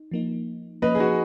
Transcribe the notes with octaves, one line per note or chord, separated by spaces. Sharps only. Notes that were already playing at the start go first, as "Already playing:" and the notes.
Already playing: D#4
F3 A#3 D#4
F3 A#3 C#4 B4 D#5
G#4
D#4 F#4